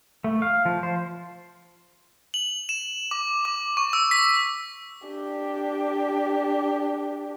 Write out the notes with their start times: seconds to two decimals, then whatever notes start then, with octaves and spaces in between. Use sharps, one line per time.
0.24 A3
0.42 F5
0.65 F3
0.83 C5
2.34 F#7
2.69 E7
3.11 D6
3.45 D6
3.77 C#6
3.93 E6
4.11 B6
5.07 D4 G4